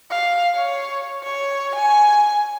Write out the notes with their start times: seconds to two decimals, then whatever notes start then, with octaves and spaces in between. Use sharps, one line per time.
0.11 F5
0.56 C#5
1.24 C#5
1.75 G#5